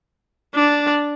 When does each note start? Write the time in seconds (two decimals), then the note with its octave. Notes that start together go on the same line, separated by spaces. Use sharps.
0.55 D4